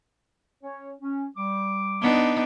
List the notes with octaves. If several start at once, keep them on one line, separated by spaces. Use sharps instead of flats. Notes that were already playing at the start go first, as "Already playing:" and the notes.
C#4 C#5
C#4
G3 D6
B3 D4 D#4